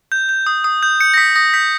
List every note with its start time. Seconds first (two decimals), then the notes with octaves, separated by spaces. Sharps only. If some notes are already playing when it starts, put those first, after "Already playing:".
0.12 G6
0.29 G6
0.47 D#6
0.64 D#6
0.83 G6
1.00 G6 C#7
1.14 A#6
1.17 D#6 B6
1.36 D#6 A#6
1.54 G6 B6